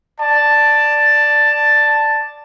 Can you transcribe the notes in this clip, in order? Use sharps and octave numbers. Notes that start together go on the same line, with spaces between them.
D5 A5